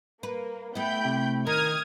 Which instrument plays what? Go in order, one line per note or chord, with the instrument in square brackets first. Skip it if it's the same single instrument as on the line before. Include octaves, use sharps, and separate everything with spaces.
[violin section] A#3 [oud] B4
[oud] A3 E4 [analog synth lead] B3 [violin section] G5 B5 G6
[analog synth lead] C3
[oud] D#3 [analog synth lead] A#4 [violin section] D#6 F6 G#6